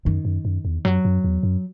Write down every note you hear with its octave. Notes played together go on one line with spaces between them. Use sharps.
F#2 D#3
F#2
F#2
E2
F#2 F#3
F#2
E2
F#2